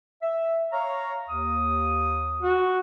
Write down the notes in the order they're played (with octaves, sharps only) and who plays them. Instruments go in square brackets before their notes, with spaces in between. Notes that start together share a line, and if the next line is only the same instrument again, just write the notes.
[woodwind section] E5
C#5 F5 A#5
D#2 D#6
[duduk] F#4